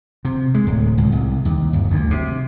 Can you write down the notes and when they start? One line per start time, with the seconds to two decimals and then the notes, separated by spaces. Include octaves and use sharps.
0.25 C3
0.54 G#3
0.67 D1
0.98 C#2
1.12 C2
1.45 D#2
1.73 G1
1.91 D2
2.11 C3